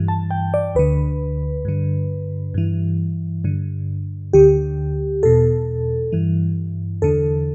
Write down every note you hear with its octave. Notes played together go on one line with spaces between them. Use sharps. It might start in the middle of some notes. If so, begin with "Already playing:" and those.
Already playing: G2 E3
A5
G5
D5
D2 D3 B4
G2 D3
G2 E3
G2 D3
D2 D3 G4
E2 B2 A4
G2 E3
E2 D3 A4